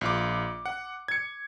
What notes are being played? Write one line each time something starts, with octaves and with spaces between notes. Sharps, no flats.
A#1 F4 D6
F#5
G#6 C#7